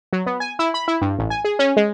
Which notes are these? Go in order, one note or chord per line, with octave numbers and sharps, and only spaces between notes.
F#3
B3
G#5
E4
B5
E4
G2
A1
G#5
G#4
C#4
G#3